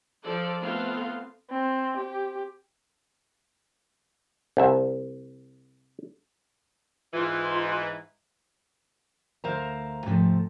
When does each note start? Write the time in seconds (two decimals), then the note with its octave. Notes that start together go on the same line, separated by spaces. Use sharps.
0.23 F3 A4 D5
0.61 A3 B3 C4 F4 F5
1.51 C4
1.97 G4
4.57 C2 E5
7.14 G#2 E3 F4
9.44 D2 A#4 C5 E5 F5 A#5
10.06 G#2 C3 E3 F3 A3